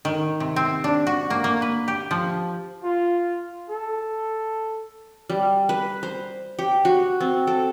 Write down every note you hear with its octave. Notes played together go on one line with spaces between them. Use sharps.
D#3
C3
C4
D4
F#4
A#3
A#3
B4
G4
F3
F4
A4
G3
B4
C5
G4
F#4
C4
A4